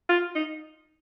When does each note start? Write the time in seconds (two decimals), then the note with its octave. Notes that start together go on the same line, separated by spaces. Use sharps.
0.09 F4
0.35 D#4